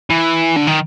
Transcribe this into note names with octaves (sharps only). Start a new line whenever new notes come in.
E3
D3
D#3